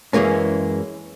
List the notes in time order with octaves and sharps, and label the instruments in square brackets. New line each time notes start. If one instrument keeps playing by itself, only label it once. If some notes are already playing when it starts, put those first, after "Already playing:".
[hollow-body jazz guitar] F#2 E3 G#3 A#3 C#4